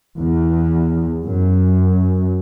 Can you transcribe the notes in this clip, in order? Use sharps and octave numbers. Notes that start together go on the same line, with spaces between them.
E2
F#2